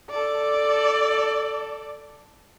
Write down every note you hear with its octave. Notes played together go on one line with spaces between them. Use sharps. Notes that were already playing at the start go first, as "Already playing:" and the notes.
A4 D5